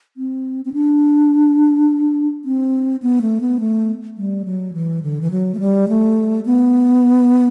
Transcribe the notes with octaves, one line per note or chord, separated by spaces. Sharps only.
C4
C4
D4
C4
B3
A3
B3
A3
G3
F#3
E3
D3
E3
F#3
A3
G3
A3
B3